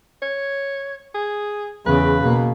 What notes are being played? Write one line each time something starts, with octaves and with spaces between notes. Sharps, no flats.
C#5
G#4
E2 C#3 B4
B2 A#3